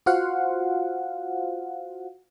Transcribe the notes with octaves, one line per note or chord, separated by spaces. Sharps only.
F4 F#4 C5 F5 F#5